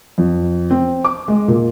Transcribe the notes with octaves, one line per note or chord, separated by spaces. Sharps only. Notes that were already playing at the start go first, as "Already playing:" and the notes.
F2
C4
D6
G#3
A#2